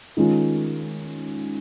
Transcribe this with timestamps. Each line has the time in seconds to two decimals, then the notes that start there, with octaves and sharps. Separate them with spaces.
0.17 D#3 G#3 C#4 F4